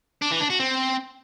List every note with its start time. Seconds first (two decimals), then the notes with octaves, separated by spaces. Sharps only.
0.22 D4
0.31 E3
0.41 D4
0.50 F#4
0.60 C4